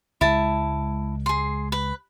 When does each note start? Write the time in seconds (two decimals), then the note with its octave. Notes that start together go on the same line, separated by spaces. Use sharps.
0.21 C#2 G#3 E4 A5
1.26 G#4 C6
1.72 B4